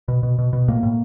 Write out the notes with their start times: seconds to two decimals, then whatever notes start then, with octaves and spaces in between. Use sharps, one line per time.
0.08 B2
0.23 B2
0.39 B2
0.53 B2
0.68 A2 A#3
0.83 A2